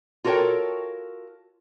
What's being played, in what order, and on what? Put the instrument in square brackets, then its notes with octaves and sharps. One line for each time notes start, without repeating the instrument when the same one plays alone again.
[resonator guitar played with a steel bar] F4 F#4 A4 A#4 C#5 G5